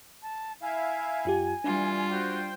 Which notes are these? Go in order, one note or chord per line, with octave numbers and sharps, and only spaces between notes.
A5
E4 E5 F5 G#5
F#2 F4 G4
E3 G3 D4 F4
F#4 C5 G5 C6